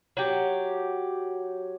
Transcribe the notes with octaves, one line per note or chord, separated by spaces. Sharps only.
F#3 G4